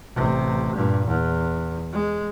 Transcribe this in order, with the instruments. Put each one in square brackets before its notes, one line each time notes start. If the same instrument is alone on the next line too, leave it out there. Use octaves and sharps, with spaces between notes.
[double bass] A1 C3
G2 A#2
E2
G#3